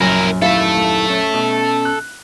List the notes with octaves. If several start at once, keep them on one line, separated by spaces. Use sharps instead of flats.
A#1 F#2 F#3 E4 A#4 G#5
D#2 E4 A4 E5 F5
C#4
B2
F#6